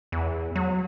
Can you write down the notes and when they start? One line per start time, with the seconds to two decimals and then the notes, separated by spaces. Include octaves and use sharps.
0.12 E2
0.56 F#3